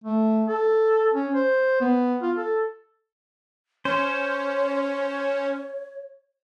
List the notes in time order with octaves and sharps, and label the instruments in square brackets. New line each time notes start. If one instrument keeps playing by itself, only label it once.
[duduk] A3
A4
C#4
C5
B3
F4
A4
[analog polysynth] C#4 [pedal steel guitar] C5 [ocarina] C#5